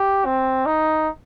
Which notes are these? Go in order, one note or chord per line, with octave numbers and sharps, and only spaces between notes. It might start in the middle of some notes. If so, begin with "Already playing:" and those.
Already playing: G4
C4
D#4